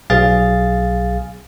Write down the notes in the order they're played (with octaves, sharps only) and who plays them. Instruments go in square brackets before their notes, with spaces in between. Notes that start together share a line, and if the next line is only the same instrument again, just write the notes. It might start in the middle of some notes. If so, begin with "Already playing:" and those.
[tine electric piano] B1 G#4 F5 A6